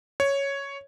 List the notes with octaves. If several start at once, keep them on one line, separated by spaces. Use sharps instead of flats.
C#5